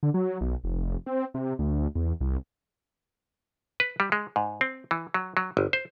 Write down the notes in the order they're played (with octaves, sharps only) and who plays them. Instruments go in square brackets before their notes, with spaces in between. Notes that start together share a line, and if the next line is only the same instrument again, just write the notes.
[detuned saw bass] D3
F#3
B1
F1
C4
C3
D2
E2
C2
[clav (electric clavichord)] B4
G3
G#3
G#2
C4
E3
F#3
F#3
G1
C5